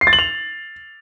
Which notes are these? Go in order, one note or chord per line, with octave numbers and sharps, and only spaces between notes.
C7
A6
F#7
F7